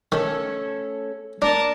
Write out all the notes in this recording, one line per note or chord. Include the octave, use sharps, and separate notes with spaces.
D#3 A3 C#4 A4
A#3 D4 A#4 D5 A5